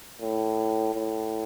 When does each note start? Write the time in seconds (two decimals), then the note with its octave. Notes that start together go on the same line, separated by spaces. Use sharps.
0.21 A2
0.94 A2